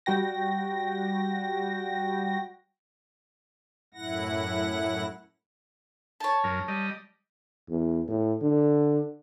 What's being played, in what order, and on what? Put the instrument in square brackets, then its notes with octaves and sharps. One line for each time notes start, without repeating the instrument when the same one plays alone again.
[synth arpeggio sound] G3 F#4 G5 A#6
[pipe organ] F#2 A2 E4 F#5 A#6
[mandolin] C#5 A5
[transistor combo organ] F#2 A#4
G3 D#5
[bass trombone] E2
A2
D3